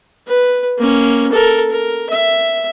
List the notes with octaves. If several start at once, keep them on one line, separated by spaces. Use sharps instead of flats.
B4
A#3 C#4
A4 A#4
A#4
E5